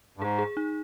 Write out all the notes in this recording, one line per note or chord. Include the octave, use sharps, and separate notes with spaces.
G2
G#2 G#4
G#4
D#4